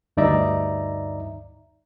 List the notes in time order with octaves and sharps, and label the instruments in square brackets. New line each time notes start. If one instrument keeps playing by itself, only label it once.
[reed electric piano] D2 G2 D#4 D5 E5 A#5